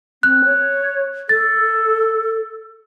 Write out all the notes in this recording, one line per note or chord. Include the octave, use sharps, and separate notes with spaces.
C4 F#6
C#5
A4 A6